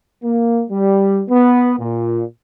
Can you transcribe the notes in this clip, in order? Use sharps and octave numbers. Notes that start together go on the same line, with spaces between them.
A#3
G3
B3
A#2